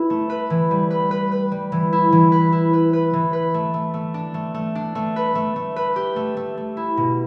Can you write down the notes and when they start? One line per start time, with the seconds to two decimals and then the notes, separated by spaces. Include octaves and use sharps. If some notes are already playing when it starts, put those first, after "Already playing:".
Already playing: E4 B4
0.10 A3
0.30 B4
0.50 E3
0.71 G3
0.90 B4
1.11 B4
1.32 B4
1.52 G3
1.72 E3
1.93 E4
2.12 E3
2.32 B4
2.52 E4
2.73 B4
2.93 B4
3.13 E3
3.33 B4
3.54 A3
3.74 A3
3.94 A3
4.14 D4
4.34 A3
4.54 A3
4.75 D4
4.95 A3
5.16 B4
5.35 A3
5.56 A3
5.76 B4
5.96 G4
6.16 A3
6.37 A3
6.57 A3
6.77 E4
6.97 B2